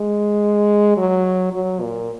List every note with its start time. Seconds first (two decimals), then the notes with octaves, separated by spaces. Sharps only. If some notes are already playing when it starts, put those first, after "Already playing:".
Already playing: G#3
0.97 F#3
1.53 F#3
1.81 A#2